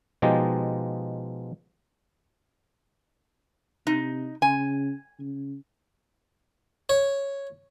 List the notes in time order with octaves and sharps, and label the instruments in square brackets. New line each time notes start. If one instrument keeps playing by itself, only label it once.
[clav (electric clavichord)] B2 F3 G#3 D#4 G4 D#5
[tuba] C3 [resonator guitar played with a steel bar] D#4
[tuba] C#3 [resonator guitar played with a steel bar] G#5
[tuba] C#3
[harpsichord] C#5